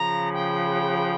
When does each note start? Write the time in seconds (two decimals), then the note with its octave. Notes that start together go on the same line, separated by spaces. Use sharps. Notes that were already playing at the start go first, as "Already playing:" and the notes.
Already playing: C#3 F3 A#5
0.33 G5